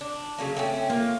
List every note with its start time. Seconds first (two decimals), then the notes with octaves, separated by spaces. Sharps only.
0.01 D4
0.38 C#3 F#3 A#3
0.57 A3 C4 C#4
0.90 A#3 F4